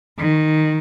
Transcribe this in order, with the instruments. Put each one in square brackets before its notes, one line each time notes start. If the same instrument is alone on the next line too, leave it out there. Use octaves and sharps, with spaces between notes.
[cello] D#3